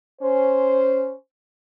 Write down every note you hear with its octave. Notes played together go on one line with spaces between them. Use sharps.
C#4 C5